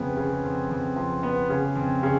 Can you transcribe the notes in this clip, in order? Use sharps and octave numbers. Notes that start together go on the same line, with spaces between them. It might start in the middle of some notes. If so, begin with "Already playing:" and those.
Already playing: F2 C#3 B3
C#3
F2
F2
F3
B3
C#3
F2
C#3